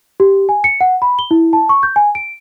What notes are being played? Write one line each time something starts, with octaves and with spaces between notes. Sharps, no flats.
G4
G#5
C#7
F#5
B5
G7
E4
A5
C#6
G6
G#5
D7